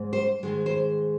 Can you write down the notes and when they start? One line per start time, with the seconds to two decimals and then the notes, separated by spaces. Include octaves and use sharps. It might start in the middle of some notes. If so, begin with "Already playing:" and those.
Already playing: G#2 G#3
0.13 C5
0.43 G#2 D#3 G#3 C5
0.66 C5